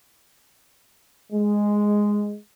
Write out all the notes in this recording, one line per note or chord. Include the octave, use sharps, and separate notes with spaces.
G#3